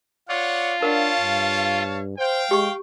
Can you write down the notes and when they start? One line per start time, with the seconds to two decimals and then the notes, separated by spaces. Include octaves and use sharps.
0.28 F4 C#5 D5 F#5
0.82 D4 A#4 C#5 F5 F#5 A5
1.20 G2
2.19 C5 F5 G5
2.51 G#3 G4 C#6